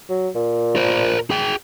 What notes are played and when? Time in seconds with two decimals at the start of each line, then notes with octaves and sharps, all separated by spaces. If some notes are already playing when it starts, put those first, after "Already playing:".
0.09 F#3
0.35 A#2
0.76 A#4 C5
1.30 G#4 G5